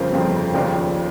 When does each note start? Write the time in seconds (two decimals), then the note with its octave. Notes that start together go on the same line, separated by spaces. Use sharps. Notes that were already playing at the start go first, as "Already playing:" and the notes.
Already playing: G1 F2 C#3 F3 A#4 C5
0.12 G1 F2 C#3 F3
0.54 D#2 C#3 F3 C5 D5